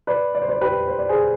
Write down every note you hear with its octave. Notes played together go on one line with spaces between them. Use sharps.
B4 D5
D5
C5
B4 D5
G4 B4
C5
D5
G#4 C5